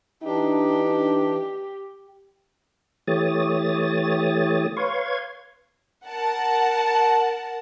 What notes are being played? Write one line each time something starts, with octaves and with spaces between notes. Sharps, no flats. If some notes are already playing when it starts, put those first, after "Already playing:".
E3 D4 D#4 G4
E3 A3 G4 C#5 D#6 A6
B4 C#5 F5 C6 C#6 G#6
A#4 F#5 A5